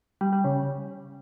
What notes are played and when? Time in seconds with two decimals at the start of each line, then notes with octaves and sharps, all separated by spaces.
0.21 G3
0.33 G3
0.44 C#3